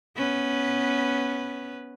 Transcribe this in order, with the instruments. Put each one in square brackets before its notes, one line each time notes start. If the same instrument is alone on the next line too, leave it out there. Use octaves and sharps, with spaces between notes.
[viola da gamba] B3 C#4 B4